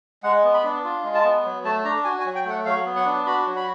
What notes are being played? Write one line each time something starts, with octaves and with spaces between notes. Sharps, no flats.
G#3 F#5
B3
B5
D4
F4
G#3
A5
B3
F#3
A3 A5
D4 A#5
F#4 G#5
G#5
F#3
G5
A3 F#5
F#3 F5
B3
F#5
D4
F#4 B5
F#3
B5